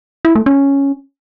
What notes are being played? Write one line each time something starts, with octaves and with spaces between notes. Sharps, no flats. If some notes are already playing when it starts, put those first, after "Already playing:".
E4
A3
C#4